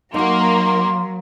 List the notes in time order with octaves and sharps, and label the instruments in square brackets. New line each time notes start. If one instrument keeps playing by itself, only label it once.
[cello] F#3 [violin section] A#3 [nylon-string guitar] D#4 F#4 [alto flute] C6